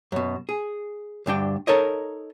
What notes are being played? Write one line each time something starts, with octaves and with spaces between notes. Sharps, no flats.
F#2 B2
G#4
D2 G2 D4 G5
D#4 A4 A#4 C#5 D#5